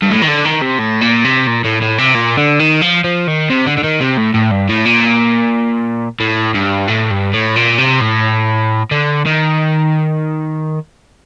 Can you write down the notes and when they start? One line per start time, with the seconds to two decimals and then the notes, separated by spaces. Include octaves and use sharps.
0.03 G2
0.11 A2
0.22 D#3
0.28 D3
0.45 D#3
0.62 C3
0.79 A2
1.01 A#2
1.24 C3
1.47 A#2
1.64 A2
1.81 A2
1.98 C3
2.14 A#2
2.37 D3
2.60 D#3
2.82 F3
3.04 F3
3.28 D#3
3.50 C3
3.67 D3
3.78 D3
3.84 D#3
4.01 C3
4.18 A2
4.34 A2
4.51 G2
4.69 A2
4.85 A#2
6.20 A2
6.55 G2
6.88 A2
7.11 G2
7.33 A2
7.56 A#2
7.79 C3
8.01 A2
8.91 D3
9.26 D#3